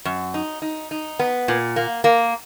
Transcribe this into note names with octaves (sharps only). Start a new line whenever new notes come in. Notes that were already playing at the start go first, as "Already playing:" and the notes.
F#2
D#4
D#4
D#4
B3
A#2
A#3
A#3